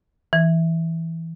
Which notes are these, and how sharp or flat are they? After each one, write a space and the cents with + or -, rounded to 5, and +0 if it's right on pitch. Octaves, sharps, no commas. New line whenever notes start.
E3 -5